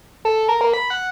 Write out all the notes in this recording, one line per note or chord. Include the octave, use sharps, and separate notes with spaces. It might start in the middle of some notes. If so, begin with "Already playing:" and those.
A4
A#4
A#3
B5
F#5